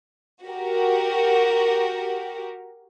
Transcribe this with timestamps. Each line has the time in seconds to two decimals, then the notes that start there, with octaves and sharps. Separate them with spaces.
0.44 F#4 G4 A#4